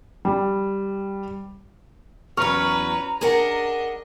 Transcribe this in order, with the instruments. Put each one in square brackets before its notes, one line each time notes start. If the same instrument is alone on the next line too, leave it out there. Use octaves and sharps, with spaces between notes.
[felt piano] G3
[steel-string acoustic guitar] E2 F#3 [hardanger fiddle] C#4 B4 [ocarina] A#5 [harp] C#6 F6
[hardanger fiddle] D4 D#5 [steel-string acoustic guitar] G#4 A#4 F#5